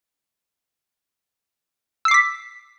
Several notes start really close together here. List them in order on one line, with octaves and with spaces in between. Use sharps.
E6 C7 D6 B6